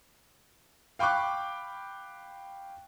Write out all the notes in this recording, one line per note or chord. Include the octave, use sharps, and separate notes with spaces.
F5 G5 B5 C#6 D6 F#6